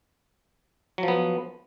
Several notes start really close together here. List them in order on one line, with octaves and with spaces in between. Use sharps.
F#3 F3 B3